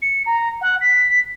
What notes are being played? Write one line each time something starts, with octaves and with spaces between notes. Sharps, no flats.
C#7
A#5
F#5
B6